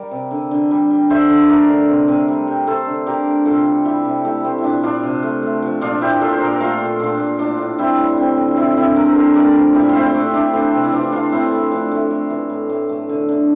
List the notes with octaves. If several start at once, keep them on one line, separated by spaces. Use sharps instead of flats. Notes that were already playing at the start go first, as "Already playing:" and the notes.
Already playing: G3 A#4 D5
C3
D3
D3
G3
G3
D3 C5 E5
D3
A3 A#4 D5
D3
C3
C3
G3
G3
A3 A4 C5
D3
D3 G4 A#4
A3
C3 F4 A4
G3
G3 E4 G4
C3
A3 E4 G4
A3 C4
E4
A#2 D4
A#2 D4 F4
C3
A3
A3
F3
A#2 D4 F4
A#2 E4 G4
A#2 F4 A4
C5
A#2 G4 A#4
A#4
A3 F4 A4
A#2
A#2 D4 F4
A#2
A2 D4
A2
G3 C4 E4
A2
D3 C4
D3
F4
D3 C4 E4
D3 C4 E4
A3 A#4
C5
D3 G4 A#4
A3 A#4 D5
F3
A#2 E4 G4
F4
A3 C4 E4
A3 D4
A3 D4
A3 C4
C3
E4
E3 D4 F4
E3 D4 F4
A2 C4 E4
A3
F3 D4
A3
A2
E3
A2
A2
A3
D3
D3